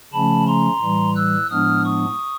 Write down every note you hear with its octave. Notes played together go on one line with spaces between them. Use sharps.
C#3 F3 A3 C#4 A5 B5
A#5 C6
A2 E3 G3
E6 F#6
A2 F3 G#3 B3 D4 D#6 F6
C#6 D#6